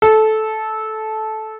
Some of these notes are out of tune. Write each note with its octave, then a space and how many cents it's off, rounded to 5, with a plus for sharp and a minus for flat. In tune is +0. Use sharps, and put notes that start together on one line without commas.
A4 -15